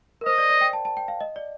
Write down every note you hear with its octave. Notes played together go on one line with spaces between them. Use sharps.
A#4
C5 D#5
D5
D5
G5
A5
A5
G5
F5
D#5
D5